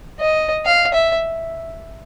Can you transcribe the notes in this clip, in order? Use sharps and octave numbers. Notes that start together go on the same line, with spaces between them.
D#5
F5
E5